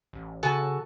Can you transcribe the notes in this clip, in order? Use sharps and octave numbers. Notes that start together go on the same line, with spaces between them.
A1
C#3 F#4 A4 G#5